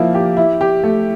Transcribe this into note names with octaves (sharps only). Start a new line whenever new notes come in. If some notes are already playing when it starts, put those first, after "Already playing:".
Already playing: F3 A#3 E4
G4
E4
G4
A3